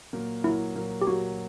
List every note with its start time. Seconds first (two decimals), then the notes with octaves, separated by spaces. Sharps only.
0.13 A#2 F#3 A#3
0.44 A#2 F#3 A#3 E4
0.75 A#2 F#3 A#3
1.01 G4
1.07 A#2 F#3 A#3 F#4